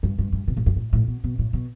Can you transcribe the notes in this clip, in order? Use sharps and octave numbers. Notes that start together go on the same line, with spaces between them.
G2
G2
G2
B2
A2
G2
A2
A2
B2
B2
A2
B2